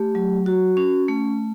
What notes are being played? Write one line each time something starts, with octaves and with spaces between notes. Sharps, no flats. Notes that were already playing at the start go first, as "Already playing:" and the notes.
Already playing: A3 G4
F#3
F#4
C#4
A3